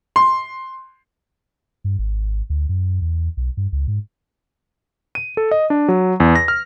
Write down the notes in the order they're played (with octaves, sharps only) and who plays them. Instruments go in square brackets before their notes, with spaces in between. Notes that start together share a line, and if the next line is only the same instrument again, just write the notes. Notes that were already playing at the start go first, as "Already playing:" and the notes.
[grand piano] C6
[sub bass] G2
G#1
D2
F#2
E2
B1
G2
C#2
G#2
[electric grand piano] D#7
A4
D#5
D4
F#3
E2
A#6
F6